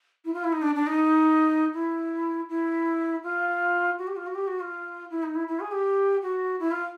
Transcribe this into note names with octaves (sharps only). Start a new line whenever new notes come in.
E4
F4
E4
D#4
D4
D4
D#4
E4
E4
F4
F#4
G4
F4
F#4
G4
F#4
F4
E4
D#4
E4
E4
G#4
G4
F#4
E4
F4